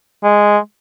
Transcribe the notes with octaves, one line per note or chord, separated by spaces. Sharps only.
G#3